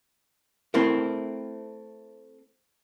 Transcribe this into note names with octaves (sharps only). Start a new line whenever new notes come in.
A3 C4 E4 A#4